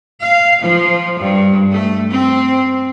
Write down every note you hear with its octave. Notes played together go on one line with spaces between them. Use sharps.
F5
F3
G2
A3
C4